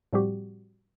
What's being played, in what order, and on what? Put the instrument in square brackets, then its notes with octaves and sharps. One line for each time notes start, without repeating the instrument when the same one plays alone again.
[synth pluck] A2 F3 G3 C4 F#4 G4